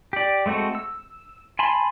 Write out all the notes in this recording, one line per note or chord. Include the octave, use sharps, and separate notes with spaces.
G4 D5
G#3 A3 C4 F#4 A4
E6
G#5 A5 B5 C6